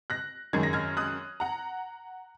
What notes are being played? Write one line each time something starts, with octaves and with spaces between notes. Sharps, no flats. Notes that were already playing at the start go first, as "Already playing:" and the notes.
F#6 A#6
F#2 D#3 G#3 G#6
A#6
F6 G#6
D#6 F#6
F#5 A#5